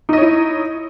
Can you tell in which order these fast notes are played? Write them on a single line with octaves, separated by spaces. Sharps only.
D#4 D#5 C#5 E4